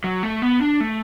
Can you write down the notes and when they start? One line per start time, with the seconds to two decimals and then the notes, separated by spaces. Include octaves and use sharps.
0.04 F#3
0.23 A3
0.42 B3
0.61 D4
0.81 A3